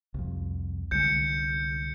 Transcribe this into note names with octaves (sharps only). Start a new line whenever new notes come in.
C2 F2
C2 D3 G#3 G6 C#7